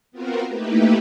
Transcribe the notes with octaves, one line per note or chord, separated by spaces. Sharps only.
B3 C4 F4 F#4 A#4
A3 A#3 D#4 E4 G4 B4